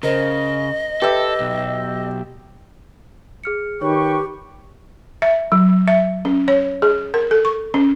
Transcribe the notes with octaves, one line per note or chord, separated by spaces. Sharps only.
C#3 A#4 C5 D#5
G4 A4 B4 E5
B1
G#4 F6 C#7
D#3 G4 B4 C#5 G5 C#6
E5
F#3
E5
C#4
C#5
G#4
A#4
A4
C#6
C#4